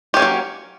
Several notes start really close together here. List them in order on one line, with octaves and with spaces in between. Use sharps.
G4 C#4 A#3 F#3